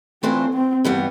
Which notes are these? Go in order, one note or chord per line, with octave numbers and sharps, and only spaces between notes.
E3 A3 C4 D4 F4 C5
C4
G2 E3 G3 B3